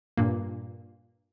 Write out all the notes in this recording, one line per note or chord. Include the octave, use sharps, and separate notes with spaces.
G2 A#2 A#3